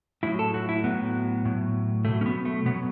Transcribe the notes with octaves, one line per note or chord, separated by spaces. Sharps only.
A2 F#3 E4
A4
F#4
E4
A2 F#3 B3
A2 F#3
B2 F#3 A3
C#4
B3
A3
B2 F#3 B3